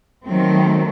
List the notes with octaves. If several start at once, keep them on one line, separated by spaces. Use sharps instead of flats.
D#3 F#3 A3 C4